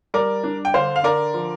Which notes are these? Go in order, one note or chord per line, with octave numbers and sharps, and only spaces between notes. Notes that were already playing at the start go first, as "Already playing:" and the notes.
G3 A#4 D5
D4
G5
D3 C5 F5
F5
D3 A#4 D5
F3